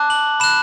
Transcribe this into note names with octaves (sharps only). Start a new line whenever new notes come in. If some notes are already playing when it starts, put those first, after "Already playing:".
Already playing: A5 D6 F#6
F#7
B5 F#6 E7